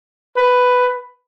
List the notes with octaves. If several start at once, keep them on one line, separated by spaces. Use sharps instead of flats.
B4